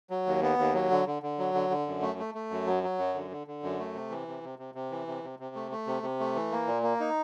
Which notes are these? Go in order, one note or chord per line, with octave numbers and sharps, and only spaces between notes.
F#3
D#2
B3
D#2
F#3
D3
D3
D3
F#3
D3
D3
F#2
A3
A3
A3
F#2
F#3
F#3
F#2
D3
D3
D3
F#2
A3
C3
E3
C3
C3
C3
C3
E3
C3
C3
C3
A3
A3
C3
C3
A3
E3
A#3
A#2
A#3
D#4